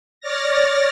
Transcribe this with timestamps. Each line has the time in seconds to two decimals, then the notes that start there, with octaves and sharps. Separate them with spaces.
0.20 C#5 D5 F6 A6 A#6